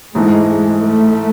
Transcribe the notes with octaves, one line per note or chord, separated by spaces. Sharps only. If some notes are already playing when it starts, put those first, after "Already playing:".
G#2 E3 G#3 A3 D#4
A3